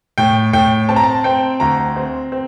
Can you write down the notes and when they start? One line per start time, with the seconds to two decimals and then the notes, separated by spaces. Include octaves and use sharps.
0.18 A2 G5
0.53 A2 G5
0.89 C4 A5
0.96 A#5
1.04 A5
1.24 C4 G5
1.60 D2 A#5
1.96 C4
2.32 C4